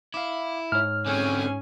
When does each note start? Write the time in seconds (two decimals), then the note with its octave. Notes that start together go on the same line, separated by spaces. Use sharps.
0.14 E4 F5 D6
0.72 G#2 C#5 F6
1.06 D3 C4 C#4 G#4 G#5